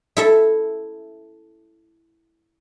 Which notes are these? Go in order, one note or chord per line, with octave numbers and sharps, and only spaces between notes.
E4 A4 E5